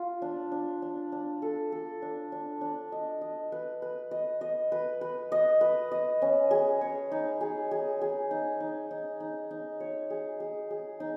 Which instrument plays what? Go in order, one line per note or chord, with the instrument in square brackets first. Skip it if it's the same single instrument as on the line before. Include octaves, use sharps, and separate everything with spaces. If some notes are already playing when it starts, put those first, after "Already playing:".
Already playing: [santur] F4
D4
D4
D4
D4
A4
A4
D4
D4
D4
D#5
D#5
B4
B4
D#5
D#5
B4
B4
D#5
B4
D#5
C#4
G#4
C#5
D#4
G#4
G#4
G#4
D#4
D#4
D#4
D#4
D#4
C#5
G#4
G#4
G#4
D#4